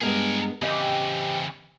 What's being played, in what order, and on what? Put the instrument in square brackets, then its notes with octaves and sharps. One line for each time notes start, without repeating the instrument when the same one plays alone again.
[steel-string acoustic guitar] G2 G#3 B3 [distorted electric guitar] G#4 A#4
[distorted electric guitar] C#3 E3 [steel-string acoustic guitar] C4 D#5 [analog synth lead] G4